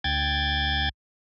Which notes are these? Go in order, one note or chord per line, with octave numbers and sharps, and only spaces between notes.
D2 G5 G#6 A6